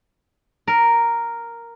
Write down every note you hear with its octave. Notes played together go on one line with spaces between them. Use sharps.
A#4